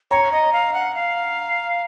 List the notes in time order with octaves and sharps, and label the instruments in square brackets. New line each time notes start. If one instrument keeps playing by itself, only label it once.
[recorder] C#5 [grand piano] A#5
[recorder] D#5
F5
F#5
F5